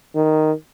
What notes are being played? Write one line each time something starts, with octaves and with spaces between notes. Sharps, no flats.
D#3